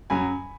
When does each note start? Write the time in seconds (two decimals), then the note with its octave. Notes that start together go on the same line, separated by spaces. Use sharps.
0.10 F#2 C#3 F#3 G#5 B5